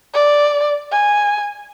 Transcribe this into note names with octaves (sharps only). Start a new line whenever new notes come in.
D5
G#5